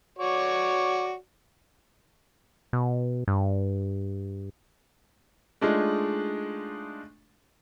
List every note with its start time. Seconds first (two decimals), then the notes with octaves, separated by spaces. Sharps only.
0.19 F#4 C#5 D5
2.73 B2
3.28 G2
5.61 G#3 A3 D4 D#4 F4 G#4